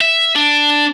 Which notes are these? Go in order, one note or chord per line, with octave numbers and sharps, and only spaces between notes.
E5
D4